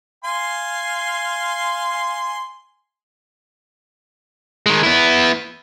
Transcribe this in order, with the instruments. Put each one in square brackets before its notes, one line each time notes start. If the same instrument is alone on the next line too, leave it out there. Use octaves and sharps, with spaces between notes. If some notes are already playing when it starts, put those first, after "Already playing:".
[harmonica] F5 G#5 C6
[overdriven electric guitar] D#3 G#3
B3 E4